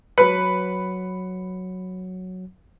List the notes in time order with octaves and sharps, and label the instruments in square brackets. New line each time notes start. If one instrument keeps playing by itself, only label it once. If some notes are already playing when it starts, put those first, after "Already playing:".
[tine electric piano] F#3 C#7 [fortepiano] B4